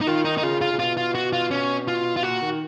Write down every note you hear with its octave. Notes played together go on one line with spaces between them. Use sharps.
D#4
D#3 F4
D#4
D#4
C#3 F4
F4
C#3
B2 F4
F4
F#4
F4
C#4
F4
F4
A#2 F#4
D#3